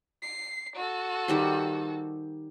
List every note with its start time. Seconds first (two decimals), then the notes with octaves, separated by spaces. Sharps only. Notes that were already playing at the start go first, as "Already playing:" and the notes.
0.23 C7
0.76 F#4 A4
1.28 D#3 G3 C5